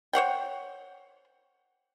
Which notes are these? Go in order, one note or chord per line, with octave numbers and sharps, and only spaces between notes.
C5 C#5 F#5 G5